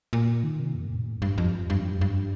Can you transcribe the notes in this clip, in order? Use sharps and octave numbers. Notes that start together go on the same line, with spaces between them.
A#2
D#3
C3
F2
A2
A#2
A2
F2
G2
F2
G2
F2
G2
G2